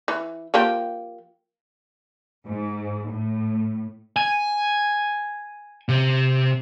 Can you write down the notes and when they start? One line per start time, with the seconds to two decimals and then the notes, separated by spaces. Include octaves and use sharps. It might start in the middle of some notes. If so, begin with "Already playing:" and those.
0.08 E3
0.54 F3 A#3 G4
2.48 G#2
3.10 A2
4.16 G#5
5.89 C3